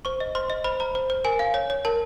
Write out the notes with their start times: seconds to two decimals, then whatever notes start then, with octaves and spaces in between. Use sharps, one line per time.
0.05 C5 C#6
0.20 D#5
0.35 C5 C6
0.50 D#5
0.64 C5 B5
0.80 C5 A#5
0.95 C5
1.10 C5
1.24 A#4 G#5
1.39 F5
1.54 C#5
1.70 C#5
1.85 A#4 A5